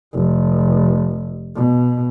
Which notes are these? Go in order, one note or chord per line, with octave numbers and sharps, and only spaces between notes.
F1
B2